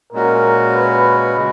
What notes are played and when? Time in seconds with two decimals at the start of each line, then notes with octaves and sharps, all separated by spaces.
0.12 A#2 G#3 C#4 F#4 A#4
0.75 B4
1.36 C#3 G#3